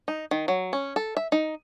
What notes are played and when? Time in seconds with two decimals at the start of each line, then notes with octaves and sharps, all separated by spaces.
0.08 D#4
0.31 D#3
0.48 F#3
0.73 C#4
0.96 A4
1.17 E5
1.32 D#4